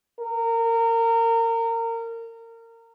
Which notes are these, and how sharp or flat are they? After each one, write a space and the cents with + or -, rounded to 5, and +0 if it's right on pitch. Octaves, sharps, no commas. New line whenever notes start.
A#4 -25